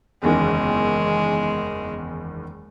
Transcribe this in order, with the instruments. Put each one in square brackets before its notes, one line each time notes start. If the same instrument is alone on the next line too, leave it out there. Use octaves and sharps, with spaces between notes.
[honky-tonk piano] F#1 E2 D#3 [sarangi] G#3